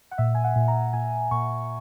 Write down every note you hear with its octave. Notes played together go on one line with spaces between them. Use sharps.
F#5
A#2 E5
G#5
F#5
A#2
A#5
A#2 G#5
A#2 C#6